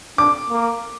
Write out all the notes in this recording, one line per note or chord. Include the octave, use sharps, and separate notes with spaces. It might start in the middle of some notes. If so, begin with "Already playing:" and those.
D4 D6
A#3